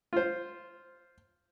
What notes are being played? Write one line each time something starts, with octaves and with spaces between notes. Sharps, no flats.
F4 C5